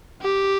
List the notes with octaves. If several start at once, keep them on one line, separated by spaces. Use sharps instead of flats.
G4